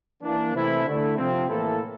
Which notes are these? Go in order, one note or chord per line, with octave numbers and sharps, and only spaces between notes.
E3 A#3 D4
C3 E3 A3 C4 E4
D3 A3 E4
C3 F3 C4
A2 E3 A#3 E4 A4